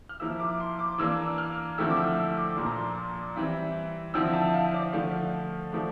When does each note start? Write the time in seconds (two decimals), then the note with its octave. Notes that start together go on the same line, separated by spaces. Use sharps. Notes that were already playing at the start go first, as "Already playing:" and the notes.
0.09 F6
0.20 F3 A#3 E4 E6
0.40 D6
0.60 C6
0.79 D6
0.98 E3 A#3 D4 E6
1.38 F6
1.78 D3 F3 A3 C4 E4 E6
1.90 D6
1.97 E6
2.17 E6
2.37 D6
2.56 A#2 F3 A#3 D4 C6
2.66 A#5
2.76 C6
3.36 E3 G3 C4 E4
4.14 D3 F3 C4 E4 E6
4.33 A5
4.54 F5
4.74 D5
4.93 D3 F3 A3 D4 F5
5.72 F3 A3 D4